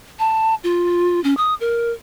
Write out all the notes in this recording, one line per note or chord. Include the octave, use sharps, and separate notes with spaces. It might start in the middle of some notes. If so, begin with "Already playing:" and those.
A5
F4
C#4
D#6
A#4